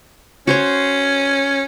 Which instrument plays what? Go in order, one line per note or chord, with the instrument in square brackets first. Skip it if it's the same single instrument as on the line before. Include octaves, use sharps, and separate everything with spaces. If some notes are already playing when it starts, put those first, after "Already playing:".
[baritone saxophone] C#4 [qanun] F#4 C5 C#5